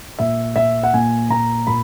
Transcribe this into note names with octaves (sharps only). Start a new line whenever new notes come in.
A#2 E5
A#2 E5
F#5
A#2 G#5
A#2 A#5
A#2 B5